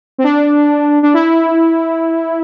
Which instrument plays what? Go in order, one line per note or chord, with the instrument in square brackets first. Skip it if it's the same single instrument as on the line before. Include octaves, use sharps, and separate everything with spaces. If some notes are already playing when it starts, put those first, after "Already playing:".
[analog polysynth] C4
D4
D4
E4